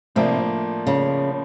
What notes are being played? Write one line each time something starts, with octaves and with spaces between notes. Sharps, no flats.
A2 C3 F3 A#3 D4
C#3